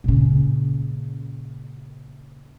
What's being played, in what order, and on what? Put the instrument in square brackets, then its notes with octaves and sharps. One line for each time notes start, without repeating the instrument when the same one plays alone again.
[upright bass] A#2 C#3